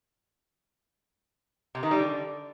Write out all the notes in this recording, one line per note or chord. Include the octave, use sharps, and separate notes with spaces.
C3
D#3
G3
D3